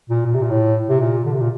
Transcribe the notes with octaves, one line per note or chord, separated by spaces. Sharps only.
A#2
A#2
C3
A#2
A2
C3
A#2
D3
C3
A#2